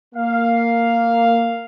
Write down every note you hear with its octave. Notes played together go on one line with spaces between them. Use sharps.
A#3 F5